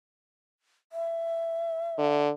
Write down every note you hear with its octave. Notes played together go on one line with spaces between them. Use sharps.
E5
D3